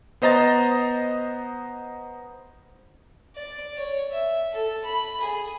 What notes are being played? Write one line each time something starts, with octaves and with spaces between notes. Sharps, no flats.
B3 C5 D#5 A#5 A6
D5
C#5
E5
A4
B5
G#4